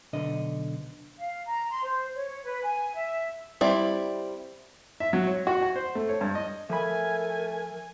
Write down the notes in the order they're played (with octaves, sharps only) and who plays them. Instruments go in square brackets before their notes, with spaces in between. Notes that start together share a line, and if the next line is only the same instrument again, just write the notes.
[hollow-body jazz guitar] B1 D3 D#5
[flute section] F5
A#5
C6
C5
C#5
B4
G#5
E5
[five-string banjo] G3 C4 E4 D5
[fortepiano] E5
F#3
C#5
F#4
F#5
C5
A3
C#5
G2
D#5
[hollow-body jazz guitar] F3 B5 [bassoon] A3 [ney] A#4 [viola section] G#5